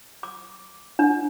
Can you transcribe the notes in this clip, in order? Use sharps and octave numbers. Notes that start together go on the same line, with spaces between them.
D6
D4